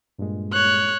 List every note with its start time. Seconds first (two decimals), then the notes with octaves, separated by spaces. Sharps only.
0.18 G2 A#2 G#3
0.53 C#5 F#6